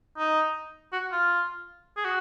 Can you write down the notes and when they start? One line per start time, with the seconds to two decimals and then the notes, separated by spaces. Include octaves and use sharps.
0.18 D#4
0.92 F#4
1.12 F4
1.97 G#4
2.05 F#4